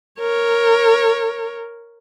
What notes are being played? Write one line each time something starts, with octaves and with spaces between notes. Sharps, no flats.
A#4 C#5